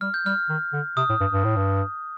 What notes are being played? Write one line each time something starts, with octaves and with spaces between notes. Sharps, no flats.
G3 F6
G6
G3 F6
D#3
D3
C3 D#6
A2
G2
G2
A2
G2